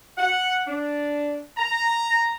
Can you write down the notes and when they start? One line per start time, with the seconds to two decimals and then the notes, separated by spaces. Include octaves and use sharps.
0.18 F#5
0.66 D4
1.57 A#5